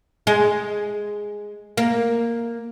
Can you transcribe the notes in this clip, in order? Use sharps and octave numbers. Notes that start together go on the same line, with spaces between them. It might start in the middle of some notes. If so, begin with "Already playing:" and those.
G#3
A#3